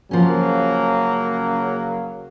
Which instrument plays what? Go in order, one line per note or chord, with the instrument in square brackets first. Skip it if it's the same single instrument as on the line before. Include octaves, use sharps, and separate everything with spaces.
[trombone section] C#3 F#3 A#3 [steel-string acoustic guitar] F3 C#4